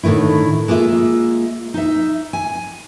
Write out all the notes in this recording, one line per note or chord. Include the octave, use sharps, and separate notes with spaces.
A2 D3 D#3 A3 E4
G#3 A#3 F4 E5
D#4 E5
G#5